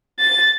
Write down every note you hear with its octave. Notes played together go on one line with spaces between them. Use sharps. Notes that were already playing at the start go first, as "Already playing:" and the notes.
A6